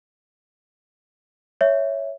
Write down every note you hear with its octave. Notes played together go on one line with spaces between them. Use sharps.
C#5 E5